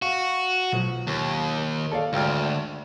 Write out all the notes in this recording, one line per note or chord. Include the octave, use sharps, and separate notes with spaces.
F#4 F5
B1 F3
D#2
A4 D5 F5
G#1 D2 G5 F6